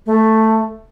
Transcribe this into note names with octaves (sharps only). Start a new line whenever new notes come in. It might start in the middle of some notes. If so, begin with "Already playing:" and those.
A3